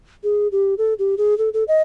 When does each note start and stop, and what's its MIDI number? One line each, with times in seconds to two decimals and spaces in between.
0.24 0.48 68
0.52 0.74 67
0.78 0.94 69
0.99 1.15 67
1.18 1.37 68
1.38 1.49 69
1.54 1.64 69
1.68 1.82 75